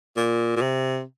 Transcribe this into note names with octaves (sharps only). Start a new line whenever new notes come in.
A#2
A#2
C3